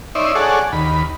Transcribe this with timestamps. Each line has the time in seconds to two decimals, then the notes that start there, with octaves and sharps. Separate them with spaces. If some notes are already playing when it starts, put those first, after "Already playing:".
0.15 D#4 C#5 D5 E5 C6
0.35 G#4 A4 C#5 D5 F#5
0.72 D#2 B5